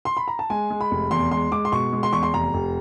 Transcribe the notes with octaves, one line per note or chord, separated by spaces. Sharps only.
C6
B5
A#5
A5
G#3 G#5
G#3
B5
F1
E2 C6
G#3 C6
G#3 D6
C6
B2 C#6
G#3
C6
E2 C#6
C6
F1 A#5
F1